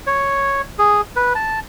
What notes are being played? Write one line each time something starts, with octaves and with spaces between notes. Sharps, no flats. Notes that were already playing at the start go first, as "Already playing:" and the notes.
C#5
G#4
B4
A5